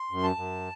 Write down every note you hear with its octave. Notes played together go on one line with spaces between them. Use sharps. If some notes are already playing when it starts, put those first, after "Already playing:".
Already playing: C6
F#2
A5
F#2